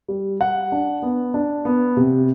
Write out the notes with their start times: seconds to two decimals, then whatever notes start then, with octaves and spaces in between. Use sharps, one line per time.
0.08 G3
0.40 G3 F#5
0.72 D4
1.02 B3
1.34 D4
1.65 B3
1.97 C3